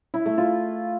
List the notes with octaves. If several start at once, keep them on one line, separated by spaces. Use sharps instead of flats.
E4
A3
F4